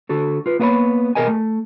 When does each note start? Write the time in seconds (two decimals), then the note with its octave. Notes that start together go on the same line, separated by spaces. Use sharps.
0.09 D3 F#4 A4
0.46 F4 B4
0.59 A#3 B3 E4 F4 C#5 B5
1.15 B2 G#4 A#4 D#5 G#5
1.28 A3